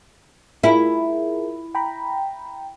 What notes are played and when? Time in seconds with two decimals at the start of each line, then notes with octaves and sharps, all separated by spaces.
0.63 E4 F4 G#4 A#4
1.75 G5 A#5 B5